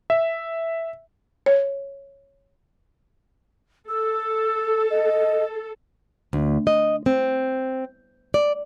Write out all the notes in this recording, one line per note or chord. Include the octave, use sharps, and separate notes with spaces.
E5
C#5
A4 E6
D#5
D2
D#5
C4
D5